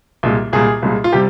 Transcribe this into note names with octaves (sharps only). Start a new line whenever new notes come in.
C2 A#2 G#3
C2 A#2 G#3 G#4
C2 A#2 G#3
F4
C3 G3 G4